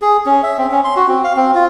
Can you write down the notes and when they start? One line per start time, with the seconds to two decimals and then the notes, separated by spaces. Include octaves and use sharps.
0.02 G#4
0.26 C#4
0.43 E5
0.58 C4
0.71 C#4
0.84 C6
0.96 F#4
1.08 C4
1.24 F5
1.36 C4
1.55 F4